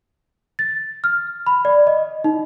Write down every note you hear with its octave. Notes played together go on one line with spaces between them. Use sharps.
A6
F6
B5
D5
D#5
D#4